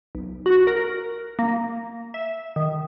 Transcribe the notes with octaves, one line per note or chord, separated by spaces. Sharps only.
B1
F#4
A#4
A#3
E5
D#3